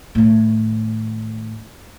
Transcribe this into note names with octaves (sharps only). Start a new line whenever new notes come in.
A2 D#3